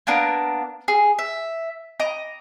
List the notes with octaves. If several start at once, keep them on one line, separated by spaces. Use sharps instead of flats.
A#3 B3 D4 A#4
G#4
E5
D#5 A#5 D6